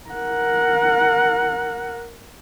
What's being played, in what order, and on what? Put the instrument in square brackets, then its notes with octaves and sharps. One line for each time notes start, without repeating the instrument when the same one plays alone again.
[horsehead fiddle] A#4 F#5